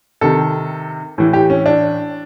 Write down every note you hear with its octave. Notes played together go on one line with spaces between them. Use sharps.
C3 D#3 A4
A2 E3
G4
C#4
D4